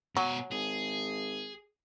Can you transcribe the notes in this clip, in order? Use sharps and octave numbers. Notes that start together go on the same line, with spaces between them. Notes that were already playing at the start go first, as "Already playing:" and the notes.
B2 F#3 G#5
G#1 G#4